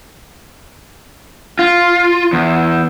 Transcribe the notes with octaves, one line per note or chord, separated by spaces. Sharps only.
F4
E2